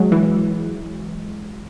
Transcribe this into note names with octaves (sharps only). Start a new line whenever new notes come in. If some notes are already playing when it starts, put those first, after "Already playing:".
Already playing: F#3 G#3
E3